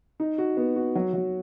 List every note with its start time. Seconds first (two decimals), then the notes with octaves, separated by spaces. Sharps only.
0.20 D#4
0.38 F#4
0.57 B3
0.76 F#4
0.95 F#3
1.14 F#3